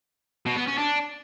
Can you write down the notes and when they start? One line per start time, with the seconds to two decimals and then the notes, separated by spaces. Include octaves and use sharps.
0.46 B2
0.57 B3
0.67 C#4
0.78 D4